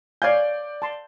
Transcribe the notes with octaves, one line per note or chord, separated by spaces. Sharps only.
C#5 D5 F5 G#5 G6
A5 C6